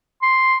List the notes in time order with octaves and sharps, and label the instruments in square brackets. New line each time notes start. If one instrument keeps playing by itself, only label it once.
[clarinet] C6